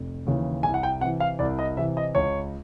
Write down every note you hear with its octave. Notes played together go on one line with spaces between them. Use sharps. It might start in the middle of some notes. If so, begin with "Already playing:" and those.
Already playing: F1
D#2 C#3 E3
C2 G#5
F#5
G5
C3 E3 F#5
F5
C2 D5
D#5
C3 E3 E5
D#5
C#2 C#5